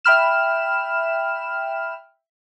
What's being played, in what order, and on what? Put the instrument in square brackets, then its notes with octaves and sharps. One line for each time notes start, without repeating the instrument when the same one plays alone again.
[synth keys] E5 G5 B5 F6 E7